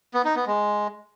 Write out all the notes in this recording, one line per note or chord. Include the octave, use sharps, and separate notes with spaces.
B3
D#4
B3
G#3